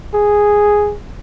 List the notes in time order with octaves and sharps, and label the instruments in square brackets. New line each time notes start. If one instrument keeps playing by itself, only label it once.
[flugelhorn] G#4